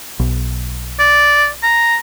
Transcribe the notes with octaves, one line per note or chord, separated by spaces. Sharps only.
B1
D5
A#5